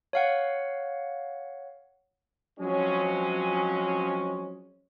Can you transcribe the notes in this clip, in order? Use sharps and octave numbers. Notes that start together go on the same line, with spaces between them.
C#5 F5 F#5
F3 F#3 G#3 C4 C#4